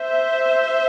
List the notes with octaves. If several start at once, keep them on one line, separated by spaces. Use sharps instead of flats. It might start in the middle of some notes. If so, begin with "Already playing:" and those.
Already playing: C5 E5